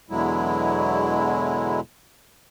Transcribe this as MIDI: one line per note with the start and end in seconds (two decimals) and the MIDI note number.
0.10 1.80 40
0.10 1.80 47
0.10 1.80 50
0.10 1.80 54
0.10 1.80 56
0.10 1.80 64